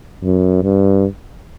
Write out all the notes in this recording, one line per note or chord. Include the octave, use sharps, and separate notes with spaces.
F#2
G2